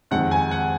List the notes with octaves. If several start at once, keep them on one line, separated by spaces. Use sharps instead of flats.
F2 D#3 G#3 F#5
G#5
F#5